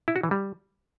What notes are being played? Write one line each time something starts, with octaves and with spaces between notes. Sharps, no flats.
E4
F#4
E3
G3